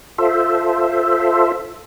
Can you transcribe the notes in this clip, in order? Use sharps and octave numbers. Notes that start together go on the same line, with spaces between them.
F4 A4 C5 E5